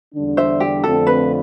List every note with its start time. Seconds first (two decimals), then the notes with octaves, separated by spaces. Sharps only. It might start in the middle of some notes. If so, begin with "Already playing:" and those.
0.14 E2 D3 G3 D4
0.37 C5 E5
0.60 G4
0.84 F2 D3 A3 C4 F4 A4
1.07 B4